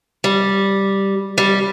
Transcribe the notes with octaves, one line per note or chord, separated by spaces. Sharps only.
G3
G3